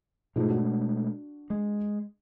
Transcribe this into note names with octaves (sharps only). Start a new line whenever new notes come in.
G#2 B2 G#3 A3 F4
D4 F#4
G#3